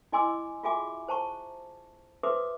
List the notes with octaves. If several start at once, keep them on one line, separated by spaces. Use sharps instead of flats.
E4 D#5 G#5 C6 D6 E6
F4 F#4 G#4 E5 G#5 D6
C5 A5 A#5 C#6
F#4 B4 C5 E5 D6 D#6